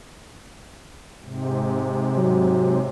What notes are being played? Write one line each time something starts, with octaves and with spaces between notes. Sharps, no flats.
G#2 C3
F#3